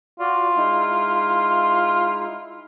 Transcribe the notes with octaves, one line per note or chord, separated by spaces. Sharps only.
F4 F#4 D5
G#3 D#4 E4